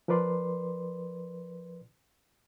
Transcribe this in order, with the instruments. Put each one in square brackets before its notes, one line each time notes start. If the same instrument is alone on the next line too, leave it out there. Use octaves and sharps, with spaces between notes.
[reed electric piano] F3 A#4 B4 D5 C6